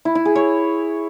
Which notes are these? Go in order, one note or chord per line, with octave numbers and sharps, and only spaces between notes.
E4
E4
G#4
C#5